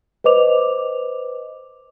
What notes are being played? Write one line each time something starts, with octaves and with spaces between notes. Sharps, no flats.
B4 C5 D#5 D6 F7